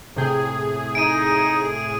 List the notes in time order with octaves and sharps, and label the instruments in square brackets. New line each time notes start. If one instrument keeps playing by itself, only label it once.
[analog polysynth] A2 G#4 [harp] C3 G5
[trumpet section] D#4 [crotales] D7 D#7